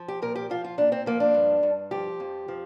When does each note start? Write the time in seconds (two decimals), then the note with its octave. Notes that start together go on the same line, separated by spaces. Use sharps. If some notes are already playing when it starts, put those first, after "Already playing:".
Already playing: F3
0.08 G4
0.22 A#2 A#4
0.35 G4
0.50 F3 F4
0.64 F4
0.78 A#2 D4
0.92 C4
1.06 F3 A#3
1.20 D4
1.34 G2
1.63 G2
1.91 F3 G4
2.20 F2
2.48 F3